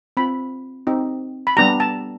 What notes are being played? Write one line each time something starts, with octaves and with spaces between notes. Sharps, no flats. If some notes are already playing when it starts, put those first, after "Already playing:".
C4 F4 B5
C4 D#4 G4
B5
G3 B3 D4 G4 A#5
A5